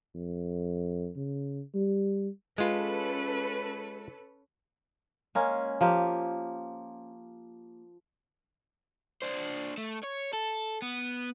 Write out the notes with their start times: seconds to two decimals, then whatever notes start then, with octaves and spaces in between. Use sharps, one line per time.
0.15 F2
1.16 C#3
1.74 G3
2.58 G#3 C#4 F4 A4 B4
5.35 G#3 A#3 C#4
5.81 F3 A#3 G4
9.22 D4 C5
9.78 A3
10.03 C#5
10.33 A4
10.82 B3